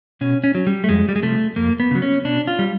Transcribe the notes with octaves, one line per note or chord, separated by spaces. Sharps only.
B2 C#4
C#4
F#3
G3
A3
F2 G#3
G3
G#3
C3 F3 A3
F2 A#3
B3
C#3 F#3
C#4
B2 D4
F4
G3